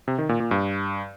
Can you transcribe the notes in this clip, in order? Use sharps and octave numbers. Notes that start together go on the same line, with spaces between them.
C3
D#3
A#2
A#2
G2